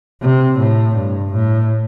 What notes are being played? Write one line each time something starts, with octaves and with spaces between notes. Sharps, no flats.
C3
A2
G2
A2